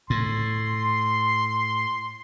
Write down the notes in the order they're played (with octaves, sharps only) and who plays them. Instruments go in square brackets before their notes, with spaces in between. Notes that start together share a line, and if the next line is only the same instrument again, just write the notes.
[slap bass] A2 [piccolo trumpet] C6